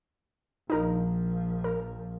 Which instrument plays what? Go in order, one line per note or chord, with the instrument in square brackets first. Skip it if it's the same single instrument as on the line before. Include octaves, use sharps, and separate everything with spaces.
[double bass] A#1 F3 [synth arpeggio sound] D#4 A#4
[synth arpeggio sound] A#4